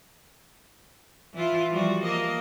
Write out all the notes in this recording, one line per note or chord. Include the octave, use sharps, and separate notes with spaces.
E3 E4 F4
F3 G3 F#4
A#3 D#5